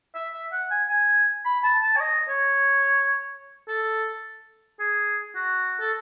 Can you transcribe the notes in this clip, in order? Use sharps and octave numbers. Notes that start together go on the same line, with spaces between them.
E5
E5
F#5
G#5
G#5
B5
A5
A5
C#5
D#5
C#5
A4
G#4
F#4
A4